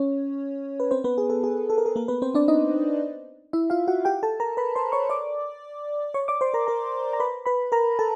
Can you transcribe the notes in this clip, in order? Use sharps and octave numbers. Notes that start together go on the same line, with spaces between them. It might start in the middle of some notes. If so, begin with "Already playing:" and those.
Already playing: C#4 C#5
B4
C4 C5
B3 B4
G#4
A4
G#4
A4
A#4
A4
A#3 A#4
B3 B4
C4 C5
D4 D5
D#4 D#5
E4 E5
F4 F5
F#4 F#5
G4 G5
A4 A5
A#4 A#5
B4 B5
C5 C6
C#5 C#6
D5 D6
C#5 C#6
D5 D6
C5 C6
A#4 A#5
A#4 A#5
A#5
B4 B5
B4 B5
A#4 A#5
A4 A5